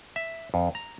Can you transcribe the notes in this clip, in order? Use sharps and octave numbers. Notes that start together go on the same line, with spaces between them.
E5
F2
A#5